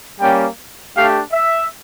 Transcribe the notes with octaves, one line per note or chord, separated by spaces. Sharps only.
G3 A#3 C#4 G5
A3 D4 G4 F5
E5